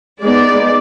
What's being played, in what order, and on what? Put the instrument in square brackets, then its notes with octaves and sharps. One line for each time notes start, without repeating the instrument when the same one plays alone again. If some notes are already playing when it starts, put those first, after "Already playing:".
[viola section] G#3 B3 D#4 D5